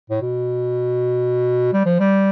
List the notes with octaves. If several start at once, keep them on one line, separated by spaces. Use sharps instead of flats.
A2
B2
G3
F3
G3